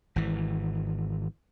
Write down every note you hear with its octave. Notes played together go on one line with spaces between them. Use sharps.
G#1 E3